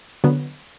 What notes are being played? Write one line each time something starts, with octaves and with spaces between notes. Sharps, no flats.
D3 F#3 B3